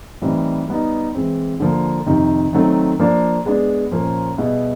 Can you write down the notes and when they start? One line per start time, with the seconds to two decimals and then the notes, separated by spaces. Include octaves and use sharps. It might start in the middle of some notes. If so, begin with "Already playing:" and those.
0.21 A2 E3 G3 C4 D#4
0.68 G3 B3 D#4
1.15 E3 G#3 C4
1.60 D3 F3 A#3
2.06 F2 C3 D#3
2.53 D#3 F#3 A3 C4
2.99 F3 A#3 D4
3.45 G#3 B3 D4
3.91 A#2 F3 A#3 C#4
4.38 B2 G3 B3 E4 G#4